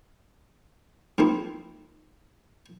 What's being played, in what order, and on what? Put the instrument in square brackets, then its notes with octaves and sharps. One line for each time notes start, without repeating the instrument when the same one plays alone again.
[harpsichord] G#2 F3 A#3 C4 E4